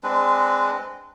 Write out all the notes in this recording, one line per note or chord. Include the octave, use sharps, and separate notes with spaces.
G#3 C4 D4 B4